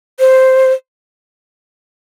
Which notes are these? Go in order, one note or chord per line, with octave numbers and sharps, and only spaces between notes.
C5